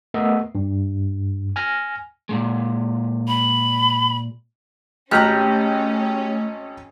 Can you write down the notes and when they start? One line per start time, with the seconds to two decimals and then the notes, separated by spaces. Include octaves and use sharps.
0.14 A3 B3 A#4 D#5 E5
0.55 G2
1.56 G#5 F6 A#6
2.29 A#2 C#3 G#3
3.28 B5
5.11 G#1 A3 C#4 G4 B4 A#5 F6 F#6